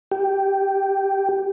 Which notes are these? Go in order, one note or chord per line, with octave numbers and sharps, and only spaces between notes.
G4